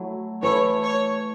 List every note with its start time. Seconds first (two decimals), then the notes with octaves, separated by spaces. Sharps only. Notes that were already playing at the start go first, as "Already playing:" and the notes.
Already playing: F#3 A3 E4
0.43 E3 A3 E4 C#5
0.82 C#5